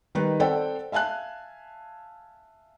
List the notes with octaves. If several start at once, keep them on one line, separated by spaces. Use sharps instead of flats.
D#3 G3 D#4 B4
C4 A4 D5 F#5 G5
E5 F5 G#5 A5 F#6